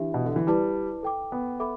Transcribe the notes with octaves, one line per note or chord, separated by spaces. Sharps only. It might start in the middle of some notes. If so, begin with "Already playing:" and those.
Already playing: E3 D4 G4 E5
B2
D3
E3
G3 E4 B4 D5 A5 D6
A4 G5 D6
B3
A4 E5 B5 D6